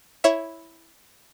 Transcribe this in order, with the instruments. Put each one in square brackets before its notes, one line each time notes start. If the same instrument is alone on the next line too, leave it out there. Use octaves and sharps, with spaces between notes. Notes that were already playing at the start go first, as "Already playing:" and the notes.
[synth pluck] E4 C#5 E5